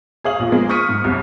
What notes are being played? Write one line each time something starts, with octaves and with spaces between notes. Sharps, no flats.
G#4 C#5 F5 D#6 F#7
A#1 A#2
F3 G#3 A#3
C#6 D#6 F6 B6 C#7 D#7
G#2
G1 C2